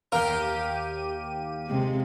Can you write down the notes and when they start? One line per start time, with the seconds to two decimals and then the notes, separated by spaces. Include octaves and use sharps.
0.12 D#2 G4 A#4 F5 G5 D#7
1.67 C3 G#3